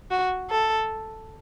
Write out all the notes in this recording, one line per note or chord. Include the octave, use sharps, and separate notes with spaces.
F#4
A4